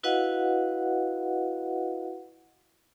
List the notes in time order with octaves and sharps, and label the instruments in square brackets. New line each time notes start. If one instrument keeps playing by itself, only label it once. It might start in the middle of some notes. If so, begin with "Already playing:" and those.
[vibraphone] E4 F#4 B4 D#5 F5 F#5